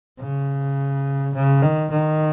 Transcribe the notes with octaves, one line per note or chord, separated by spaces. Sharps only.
C#3
C#3
D#3
D#3